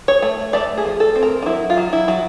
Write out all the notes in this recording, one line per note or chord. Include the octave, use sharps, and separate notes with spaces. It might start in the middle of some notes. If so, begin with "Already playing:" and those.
C#5
A3
A3 D5
G#4
F3
A4
C4
A#4
D#4
F#3 E4
F4
F#3
E4
F#3